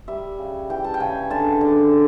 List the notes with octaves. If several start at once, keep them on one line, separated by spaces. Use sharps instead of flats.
G3 E5
C#3
E3 G5
A5
G5
C#3 G#5
D3 A5
D3